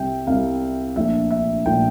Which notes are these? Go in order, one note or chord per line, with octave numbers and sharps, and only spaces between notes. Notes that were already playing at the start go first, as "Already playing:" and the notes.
Already playing: C2 C3 G3 E5 G5
C2 C3 G3 F5
A#1 A#2 A3 D4 E5
E5
A#1 A#2 A3 D4 G5